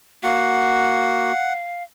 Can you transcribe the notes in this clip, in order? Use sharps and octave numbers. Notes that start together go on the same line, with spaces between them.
A#3 F#4 F5 F#5